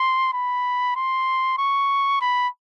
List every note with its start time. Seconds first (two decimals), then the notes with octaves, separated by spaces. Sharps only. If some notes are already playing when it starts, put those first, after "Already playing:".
Already playing: C6
0.33 B5
0.96 C6
1.58 C#6
2.21 B5